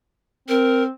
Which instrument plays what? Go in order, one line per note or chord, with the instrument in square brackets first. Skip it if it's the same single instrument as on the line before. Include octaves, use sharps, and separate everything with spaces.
[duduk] C4 [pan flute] A#4